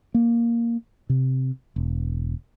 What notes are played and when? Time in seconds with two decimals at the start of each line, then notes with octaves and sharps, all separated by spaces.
0.14 A#3
1.09 C3
1.76 E1